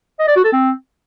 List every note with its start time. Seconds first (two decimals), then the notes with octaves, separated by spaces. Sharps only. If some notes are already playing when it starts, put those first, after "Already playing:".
0.19 D#5
0.27 D5
0.36 F#4
0.44 A4
0.53 C4